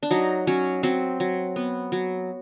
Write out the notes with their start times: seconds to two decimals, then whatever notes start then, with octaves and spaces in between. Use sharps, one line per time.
0.03 D4
0.11 F#3 D#4
0.47 F#3 C#4
0.83 F#3 C4
1.20 F#3
1.56 B3
1.92 F#3